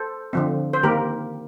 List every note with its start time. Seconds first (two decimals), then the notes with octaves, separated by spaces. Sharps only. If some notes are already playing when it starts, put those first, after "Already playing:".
Already playing: A4 C5
0.33 D3 F3 C4
0.73 C5
0.83 D#3 A#3 G4 A#4